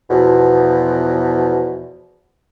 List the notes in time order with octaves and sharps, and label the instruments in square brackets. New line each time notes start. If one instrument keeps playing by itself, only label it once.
[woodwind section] E2 B2 F3